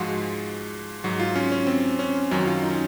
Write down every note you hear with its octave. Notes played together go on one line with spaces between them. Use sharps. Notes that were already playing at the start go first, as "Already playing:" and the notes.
Already playing: G#2 F3 G#3 F4 F#4
G#2 F#3 F#4
F4
C#4
C#4
C4
C#4
F#2 D#3 F#3 C#4
F4
D#4
C#4